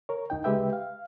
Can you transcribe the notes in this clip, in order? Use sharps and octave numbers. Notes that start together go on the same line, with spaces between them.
A#4 C#5
D2 D#4 G5
C#3 G#3 G4 B4 E5 G5
F5